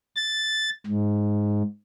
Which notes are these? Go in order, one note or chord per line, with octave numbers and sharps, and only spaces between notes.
A6
G#2